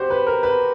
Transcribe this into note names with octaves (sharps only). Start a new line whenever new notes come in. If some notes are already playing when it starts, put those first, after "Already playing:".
Already playing: F#4 G4 C5
B4
A#4
B4